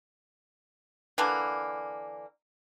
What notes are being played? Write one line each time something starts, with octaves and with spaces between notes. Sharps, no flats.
D3 E3 A#3